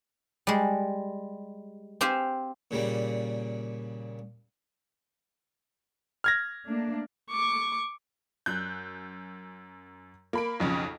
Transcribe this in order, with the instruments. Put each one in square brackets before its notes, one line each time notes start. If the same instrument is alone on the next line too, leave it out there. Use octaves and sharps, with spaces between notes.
[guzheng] G3 G#3
C4 G4 C5 F5 G#5
[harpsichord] A#2 C#3 G3 A#3
[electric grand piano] F6 G#6 A#6
[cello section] A3 A#3 D4
[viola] C#6 D6
[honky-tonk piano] F#2 F#6 G6
A#3 B5 D7
B1 F2 C#3